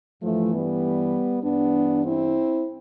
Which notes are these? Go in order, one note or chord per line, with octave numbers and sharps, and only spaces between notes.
G2 E3 F3 A3
G3 B3
G2 E3 B3 D4
C4 E4